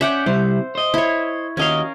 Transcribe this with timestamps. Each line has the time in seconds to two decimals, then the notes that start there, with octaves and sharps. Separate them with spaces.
0.01 C#4 D5 E5 F#5 G5
0.26 C3 G3 E4 C5
0.75 C5 D#5
0.94 E4 C#5
1.57 D#2 C#4 F#4 A#4 D#5 F5